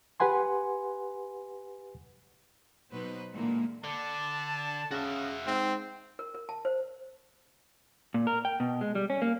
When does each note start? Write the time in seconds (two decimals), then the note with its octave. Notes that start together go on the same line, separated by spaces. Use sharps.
0.20 G4 B4 F#5 G#5 C6
2.91 B2 F#3 D#4 B4 C5
3.33 A#2 D3 E3 G#3 A#3
3.84 D3 A5
4.91 C#3 F#4 E5
5.47 G#2 C4
6.19 A#4
6.35 A#4
6.49 A5
6.65 C5
8.14 A#2
8.27 A#4
8.45 G5
8.60 B2
8.81 G#3
8.95 G3
9.10 C#4
9.22 A#3